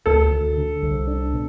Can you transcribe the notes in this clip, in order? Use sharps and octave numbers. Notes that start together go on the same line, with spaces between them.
D2 A4
D2
D3
C2
D4
B2